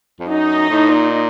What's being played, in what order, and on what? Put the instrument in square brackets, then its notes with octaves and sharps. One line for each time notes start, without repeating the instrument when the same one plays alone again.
[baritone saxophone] F2
[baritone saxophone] F#2 [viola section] D#4
[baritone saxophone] A2
A#2